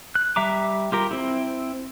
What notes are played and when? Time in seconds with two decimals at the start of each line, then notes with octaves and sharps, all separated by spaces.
0.15 F#6
0.36 G3 E5 A#5 D6
0.92 F4 G4 A#4
1.11 C4 E4